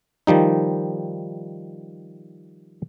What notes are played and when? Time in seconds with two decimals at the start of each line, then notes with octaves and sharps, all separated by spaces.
0.27 D#3 F3 G3 D#4